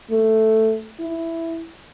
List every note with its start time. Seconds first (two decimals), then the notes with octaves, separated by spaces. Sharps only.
0.10 A3
1.00 E4